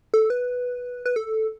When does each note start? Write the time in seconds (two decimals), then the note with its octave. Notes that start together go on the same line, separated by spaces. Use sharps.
0.14 A4
0.30 B4
1.06 B4
1.16 A4